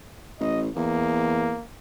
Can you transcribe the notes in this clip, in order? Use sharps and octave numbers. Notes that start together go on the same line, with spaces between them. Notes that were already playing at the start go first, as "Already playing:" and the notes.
A1 D#5
E2 A#3